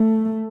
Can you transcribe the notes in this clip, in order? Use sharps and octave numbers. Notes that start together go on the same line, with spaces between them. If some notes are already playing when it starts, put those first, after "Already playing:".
Already playing: A3